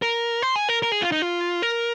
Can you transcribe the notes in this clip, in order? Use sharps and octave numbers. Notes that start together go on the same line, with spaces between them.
A#4
C5
G#4
A#4
A#4
G#4
F4
D#4
F4
A#4